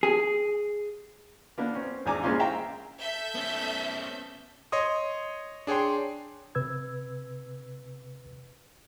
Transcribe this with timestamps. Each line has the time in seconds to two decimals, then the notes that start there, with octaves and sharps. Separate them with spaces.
0.03 G#4
1.58 A#3 B3 D4
1.75 C4 C#4
2.06 G#1 E2 D4 G#5 A#5 D6
2.23 E3 G#3 A#3 C4 C#4 F4
2.39 E5 F5 G5 A#5
3.01 A4 E5 G6
3.35 B3 C#4
4.72 C#5 D#5 C6 D#6
5.67 D4 G#4 C#5 G5 C6
6.55 C3 B4 E6 G#6